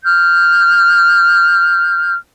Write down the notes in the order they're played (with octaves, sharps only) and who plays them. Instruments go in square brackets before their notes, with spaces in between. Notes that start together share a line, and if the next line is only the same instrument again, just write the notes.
[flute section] F6 G6